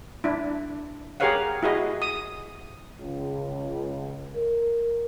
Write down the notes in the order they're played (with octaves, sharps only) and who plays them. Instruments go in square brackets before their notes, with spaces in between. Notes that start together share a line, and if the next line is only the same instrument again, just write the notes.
[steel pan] D4 E4
G4 G#4 A#4 C#5 F5 F#5
E4 F#4 G#4 D#5
D#6
[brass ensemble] C#2
A#4